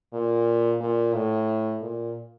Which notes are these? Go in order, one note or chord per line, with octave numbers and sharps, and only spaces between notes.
A#2
A#2
A2
A#2